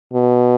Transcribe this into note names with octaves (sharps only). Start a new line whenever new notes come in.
B2